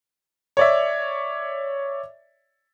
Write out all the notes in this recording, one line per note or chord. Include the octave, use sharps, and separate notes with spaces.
C#5 D5 E5